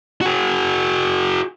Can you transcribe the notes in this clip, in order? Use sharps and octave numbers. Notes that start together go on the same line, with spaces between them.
F#4 G#4